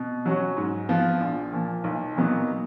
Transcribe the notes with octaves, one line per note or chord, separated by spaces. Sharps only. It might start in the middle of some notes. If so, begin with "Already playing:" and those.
Already playing: B2
F#3 C#4 F#4
G#2
F3 B3 F4
A#1
A#2 F3
B1
A#2 F#3 B3 D#4